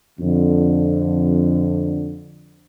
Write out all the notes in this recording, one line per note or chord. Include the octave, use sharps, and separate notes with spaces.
F2 D3